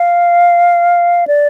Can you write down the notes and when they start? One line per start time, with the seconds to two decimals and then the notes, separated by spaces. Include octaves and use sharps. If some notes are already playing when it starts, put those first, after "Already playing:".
Already playing: F5
1.27 D5